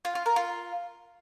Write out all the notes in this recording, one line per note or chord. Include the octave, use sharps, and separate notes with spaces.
F4
F4
A#4
F4